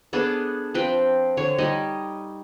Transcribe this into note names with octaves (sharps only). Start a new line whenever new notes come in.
B3 D4 G#4 A4
F3 C4 B4 G5
D3 C#5
G3 D#4 D#5